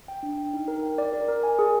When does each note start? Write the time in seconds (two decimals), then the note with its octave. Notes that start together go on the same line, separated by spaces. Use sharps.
0.08 G5
0.23 D4
0.38 G5
0.53 D#4
0.68 A#4
0.83 G5
0.98 D5
1.13 A#4
1.28 A#4
1.43 G#5
1.59 G#4